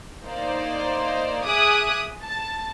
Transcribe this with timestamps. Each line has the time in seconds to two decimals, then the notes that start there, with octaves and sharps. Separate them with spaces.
0.24 A#3 D#4 C5 D5
1.46 G#4 E5 G#5 D6 D#6 F#6
2.24 A5